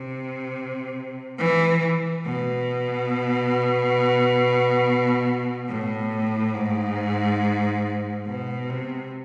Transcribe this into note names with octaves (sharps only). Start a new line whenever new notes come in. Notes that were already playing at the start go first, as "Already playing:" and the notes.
Already playing: C3
E3
B2
A2
G#2
B2
C3